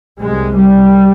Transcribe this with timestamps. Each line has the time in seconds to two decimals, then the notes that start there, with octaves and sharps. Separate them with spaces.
0.21 C2 C3 G#3
0.56 G3